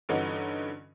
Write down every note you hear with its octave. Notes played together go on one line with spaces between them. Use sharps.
G2 D3 E3 C#4 D#4 F#4